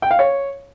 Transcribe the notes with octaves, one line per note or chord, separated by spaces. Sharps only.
G5
F5
C#5